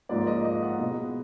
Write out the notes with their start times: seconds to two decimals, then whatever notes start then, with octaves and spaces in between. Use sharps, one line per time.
0.09 G#2 F3 A#3 D5
0.27 D#5
0.45 D#5
0.62 F#5
0.80 B2 G#3 B3